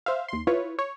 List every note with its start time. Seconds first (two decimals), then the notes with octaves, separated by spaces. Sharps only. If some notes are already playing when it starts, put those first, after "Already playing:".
0.06 C5 E5 F5
0.28 D#2 C6
0.47 E4 F4 B4 C#5
0.79 C#5